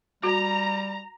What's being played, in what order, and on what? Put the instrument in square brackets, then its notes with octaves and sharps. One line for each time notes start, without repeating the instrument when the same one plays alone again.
[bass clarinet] G3 [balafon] F#4 [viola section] A#5